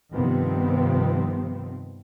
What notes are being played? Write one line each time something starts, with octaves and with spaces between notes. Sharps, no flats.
G2 C3 D#3 F3 B3 C4